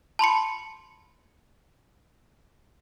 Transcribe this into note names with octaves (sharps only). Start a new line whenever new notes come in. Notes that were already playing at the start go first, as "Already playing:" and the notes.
A5 B5 C6 C#7